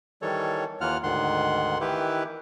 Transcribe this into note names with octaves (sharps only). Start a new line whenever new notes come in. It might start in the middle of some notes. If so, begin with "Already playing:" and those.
D#3 E3 G3 A4 C#5
D#2 E3 A#3 F4 F#5 F6
D2 G#2 D#3 F#5 C6
D#3 E3 E4 G4 B4